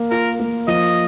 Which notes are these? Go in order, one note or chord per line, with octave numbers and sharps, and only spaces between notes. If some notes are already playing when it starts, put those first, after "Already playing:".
Already playing: A#3
F4 A#4
A#3
F3 D#5